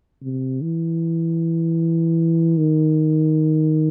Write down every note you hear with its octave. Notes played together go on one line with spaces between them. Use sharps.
C3
E3
D#3